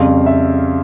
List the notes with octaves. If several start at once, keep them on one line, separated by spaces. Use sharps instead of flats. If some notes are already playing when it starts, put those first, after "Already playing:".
Already playing: F2 C#3 G3 F5
E5